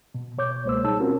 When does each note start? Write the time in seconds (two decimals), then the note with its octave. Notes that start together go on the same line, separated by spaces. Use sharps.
0.15 B2
0.38 B2 C#5 D6 G6
0.65 C#2 G#3 A#3 C5 C#5 E6
0.84 B2 G3 D#4 G#4 A5 E6
1.00 C4 C#4 F4 F#4 A#4